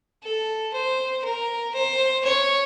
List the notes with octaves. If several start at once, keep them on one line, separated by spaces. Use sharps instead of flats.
A4
C5
A#4
C5
C#5